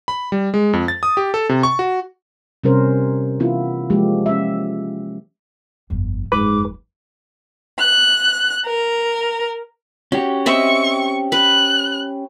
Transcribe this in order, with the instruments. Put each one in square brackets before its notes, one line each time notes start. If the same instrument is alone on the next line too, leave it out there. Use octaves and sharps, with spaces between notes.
[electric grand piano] B5
G3
G#3
F2
A6
D#6
G4
A4
C3
C#6
F#4
[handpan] C3 G3 C#4 A#4 C5
E3 B3 E4 F4
F3 G#3 A#3 G4
C#4 E5
[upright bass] G1 F2
[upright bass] F#1 F2 [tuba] G#2 [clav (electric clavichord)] B4 [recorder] D6
[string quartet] F#6
A#4
[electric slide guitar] C#4 G4 [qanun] F#4
[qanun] C4 D#5 E5 [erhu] C#6
[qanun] B4 [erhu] F#6